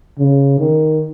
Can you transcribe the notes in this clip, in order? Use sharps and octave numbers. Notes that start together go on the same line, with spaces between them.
C#3
D#3